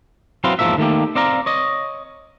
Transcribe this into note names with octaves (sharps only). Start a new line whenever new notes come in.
F#3 C4 E4 B4 F5 C6
E2 G#2 E3 F3 A#3 E5
D#3 A3 A#3 G4
C4 D5 F5 A#5
C#5 D#5